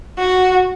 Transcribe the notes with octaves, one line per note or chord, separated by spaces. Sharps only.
F#4